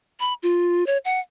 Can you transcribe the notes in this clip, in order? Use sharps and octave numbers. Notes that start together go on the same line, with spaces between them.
B5
F4
C#5
F#5